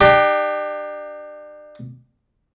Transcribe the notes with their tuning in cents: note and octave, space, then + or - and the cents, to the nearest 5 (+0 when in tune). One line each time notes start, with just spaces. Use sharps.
D4 +35 G4 +0